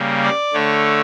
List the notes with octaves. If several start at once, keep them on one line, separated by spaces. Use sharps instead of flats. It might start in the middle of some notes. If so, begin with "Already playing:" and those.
Already playing: C#3 G3 A#3
D5
D3 A3 C#5